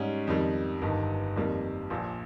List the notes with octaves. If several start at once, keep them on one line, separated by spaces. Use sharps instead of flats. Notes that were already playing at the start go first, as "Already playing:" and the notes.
Already playing: G#2 G3 C#4
F2 D#3 G3
G1 G2 D#3
F2 D#3 G3 A#3
A#1 A#2 F3